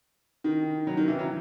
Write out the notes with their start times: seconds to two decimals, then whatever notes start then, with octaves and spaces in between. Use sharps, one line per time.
0.44 D#3
0.87 F#3
0.97 D#3
1.08 E3
1.19 F#3